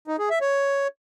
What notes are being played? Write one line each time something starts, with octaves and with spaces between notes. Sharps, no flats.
D#4
G#4
E5
C#5